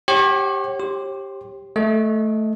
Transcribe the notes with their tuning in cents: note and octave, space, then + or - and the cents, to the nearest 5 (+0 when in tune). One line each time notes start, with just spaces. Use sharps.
G4 +0 C#5 -40 F#5 +35
G4 +0 C#5 -45 C6 +0
A3 -5 D#5 +10